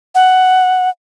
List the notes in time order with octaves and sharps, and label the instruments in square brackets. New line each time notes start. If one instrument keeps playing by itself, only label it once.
[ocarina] F#5